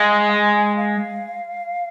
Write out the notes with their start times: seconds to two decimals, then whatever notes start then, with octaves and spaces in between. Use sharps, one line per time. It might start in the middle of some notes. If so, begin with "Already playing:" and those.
Already playing: G#3 F5
0.30 G#5
0.77 F5